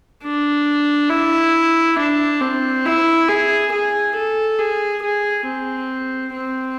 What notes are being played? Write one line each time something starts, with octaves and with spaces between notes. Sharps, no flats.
D4
E4
D4
C4
E4
G#4
G#4
A4
G#4
G#4
C4
C4